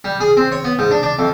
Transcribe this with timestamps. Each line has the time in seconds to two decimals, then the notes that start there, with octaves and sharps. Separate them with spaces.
0.04 G3
0.20 G#4
0.37 C4
0.52 C#5
0.64 B3
0.79 G#2
0.91 D4
1.03 D4
1.19 F2